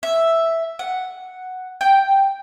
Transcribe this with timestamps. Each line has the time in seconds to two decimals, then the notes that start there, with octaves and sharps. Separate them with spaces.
0.03 E5
0.79 F#5
1.81 G5